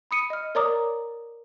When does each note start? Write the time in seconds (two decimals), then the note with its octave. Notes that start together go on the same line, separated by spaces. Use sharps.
0.11 B5 D#6 C#7 D#7
0.30 D#5 F6
0.55 A#4 C#5 D5 A#5 D6 D#6